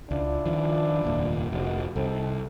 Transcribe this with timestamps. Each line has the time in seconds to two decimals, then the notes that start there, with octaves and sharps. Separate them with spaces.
0.11 C#2 D4 E4 F4
0.46 D#3 F3
1.03 F1 D#2 A#2
1.52 F1 A#1 F#4
1.96 C2 C4 D#4 A4